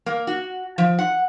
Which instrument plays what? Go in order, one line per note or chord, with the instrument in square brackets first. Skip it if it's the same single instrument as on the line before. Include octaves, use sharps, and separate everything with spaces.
[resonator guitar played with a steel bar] A#3
F#4
F3
F#5